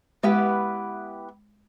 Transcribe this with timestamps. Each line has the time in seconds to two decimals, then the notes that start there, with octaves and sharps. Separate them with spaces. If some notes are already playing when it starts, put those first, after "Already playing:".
0.23 G#3 B3 E4 G4 B4